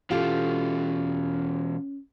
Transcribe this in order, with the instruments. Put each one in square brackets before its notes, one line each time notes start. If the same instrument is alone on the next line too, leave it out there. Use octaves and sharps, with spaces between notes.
[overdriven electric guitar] B2 E3 [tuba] C#4 [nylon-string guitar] F4 G4 A4